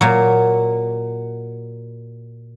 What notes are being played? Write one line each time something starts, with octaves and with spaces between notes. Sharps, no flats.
A#2 F#3